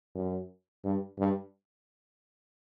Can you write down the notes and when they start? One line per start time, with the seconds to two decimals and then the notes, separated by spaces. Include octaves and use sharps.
0.15 F#2
0.85 G2
1.19 G2